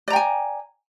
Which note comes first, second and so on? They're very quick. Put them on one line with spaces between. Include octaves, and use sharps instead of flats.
D5 A#5 G5 G#5